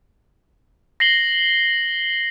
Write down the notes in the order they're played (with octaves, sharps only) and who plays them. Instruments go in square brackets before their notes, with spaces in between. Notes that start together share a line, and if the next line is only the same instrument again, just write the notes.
[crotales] A#6 C7 F#7 G7